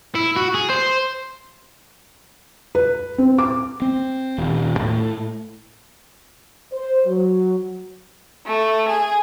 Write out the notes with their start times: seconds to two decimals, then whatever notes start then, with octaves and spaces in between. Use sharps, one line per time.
0.15 E4
0.36 F#4
0.54 G#4
0.70 C5
2.75 B4
3.18 C4
3.38 D6
3.82 C4
4.38 D#1
4.79 A2
6.72 C5
7.06 F#3
8.46 A3
8.87 G#4